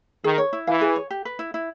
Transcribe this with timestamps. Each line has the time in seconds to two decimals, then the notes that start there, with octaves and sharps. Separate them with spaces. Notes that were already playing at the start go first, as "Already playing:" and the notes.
0.24 D#3 G#4
0.38 C#5
0.53 E4
0.67 E3 F5
0.81 G#4
0.96 C#5
1.11 G4
1.25 B4
1.39 E4
1.54 E4